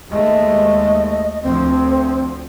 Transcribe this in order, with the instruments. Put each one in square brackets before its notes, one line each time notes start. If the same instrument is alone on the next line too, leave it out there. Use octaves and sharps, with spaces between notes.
[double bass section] D#2 G#3 A3 [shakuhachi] D#5
[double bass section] D2 F3 [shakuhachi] C4